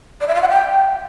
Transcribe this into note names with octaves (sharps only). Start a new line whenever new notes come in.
D5
E5
F5
F#5
G5